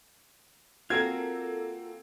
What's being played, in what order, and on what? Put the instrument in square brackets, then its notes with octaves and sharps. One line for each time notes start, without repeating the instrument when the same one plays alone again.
[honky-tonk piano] A#3 C4 A4 [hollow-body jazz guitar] F4 F#4 A#4 [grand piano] G#6